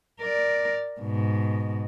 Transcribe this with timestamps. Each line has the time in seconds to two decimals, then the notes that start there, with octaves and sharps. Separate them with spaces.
0.20 A#4 D5
1.01 G#2 B2